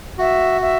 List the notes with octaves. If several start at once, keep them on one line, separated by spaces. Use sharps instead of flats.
F#4 E5
E5